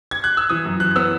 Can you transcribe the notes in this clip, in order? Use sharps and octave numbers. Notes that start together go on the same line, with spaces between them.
G#6
F#6
E6
E3 D#6
F#2
E3 F#6
B3 E6